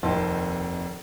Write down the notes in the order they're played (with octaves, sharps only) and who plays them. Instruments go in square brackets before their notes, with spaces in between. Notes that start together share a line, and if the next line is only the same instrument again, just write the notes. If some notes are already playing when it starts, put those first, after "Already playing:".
[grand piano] F1 D#2 C4 D#4 A5 C6